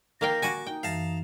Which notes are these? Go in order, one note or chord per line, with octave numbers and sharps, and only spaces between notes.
D#3 A#3 F5 G5 A#6
F#4 G#5 C#6 D6
D#4 G5
F#2 E3 F5 A5 A#5